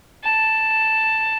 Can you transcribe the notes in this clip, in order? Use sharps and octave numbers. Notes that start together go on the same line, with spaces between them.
A5